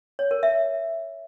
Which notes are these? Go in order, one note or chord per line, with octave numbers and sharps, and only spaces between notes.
C#5
A#4
E5